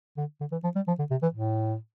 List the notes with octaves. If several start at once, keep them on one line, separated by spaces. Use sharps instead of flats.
D3
D3
E3
F3
G3
F3
D3
C3
E3
A2